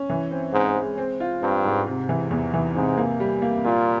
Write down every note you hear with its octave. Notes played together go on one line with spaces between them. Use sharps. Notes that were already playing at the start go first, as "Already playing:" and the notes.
Already playing: C#4
E3
C4
G#2 C4
G#3
C4
F4
G2 C4
G#2
C3
E3
E2
E3
G#2 C3
A#3
G3
A#3
A#2 F4